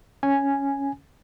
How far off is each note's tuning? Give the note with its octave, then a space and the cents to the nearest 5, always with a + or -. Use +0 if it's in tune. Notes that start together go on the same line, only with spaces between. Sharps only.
C#4 +0 G#5 +0